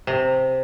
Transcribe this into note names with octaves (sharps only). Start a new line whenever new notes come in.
C3